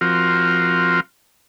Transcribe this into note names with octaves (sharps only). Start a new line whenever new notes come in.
F3 C4 F4 F#4 A#4